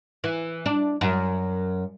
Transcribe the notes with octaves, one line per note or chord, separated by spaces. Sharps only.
E3
D4
F#2